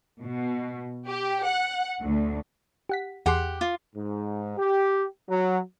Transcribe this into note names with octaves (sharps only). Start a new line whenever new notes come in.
B2
G4
F#5
D2
G4 F#5 B6
E2 G4 G#4 F#5 C6
F4
G#2
G4
F#3